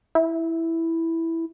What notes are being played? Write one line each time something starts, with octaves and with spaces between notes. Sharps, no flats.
E4